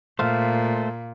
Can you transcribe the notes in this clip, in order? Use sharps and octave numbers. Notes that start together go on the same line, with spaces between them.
A#2 A3 C5 F5